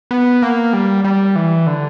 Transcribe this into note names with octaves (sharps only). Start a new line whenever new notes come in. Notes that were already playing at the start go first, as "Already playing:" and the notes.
B3
A#3
G3
G3
E3
D3